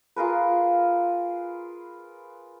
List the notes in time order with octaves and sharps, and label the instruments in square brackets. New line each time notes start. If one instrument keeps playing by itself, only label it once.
[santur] F4 G#4 A#4 B4